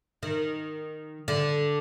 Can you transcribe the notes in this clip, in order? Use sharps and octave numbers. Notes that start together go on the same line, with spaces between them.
D#3
D3